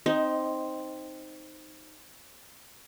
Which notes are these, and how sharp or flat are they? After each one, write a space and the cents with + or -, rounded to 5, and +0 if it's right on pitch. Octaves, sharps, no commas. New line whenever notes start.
C4 +0 D#4 +0 D#5 +20